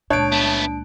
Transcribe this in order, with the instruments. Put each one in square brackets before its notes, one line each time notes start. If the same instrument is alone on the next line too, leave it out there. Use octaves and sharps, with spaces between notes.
[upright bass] C#2 A#2 [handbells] D4 D7 [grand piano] C#5 A5 F#6
[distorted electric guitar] A3 B3